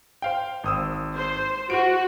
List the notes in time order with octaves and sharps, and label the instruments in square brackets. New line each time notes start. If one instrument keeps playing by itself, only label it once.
[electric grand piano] C5 F5 G5
G#1 D#6 E6
[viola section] C5
[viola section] F#4 [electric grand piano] D7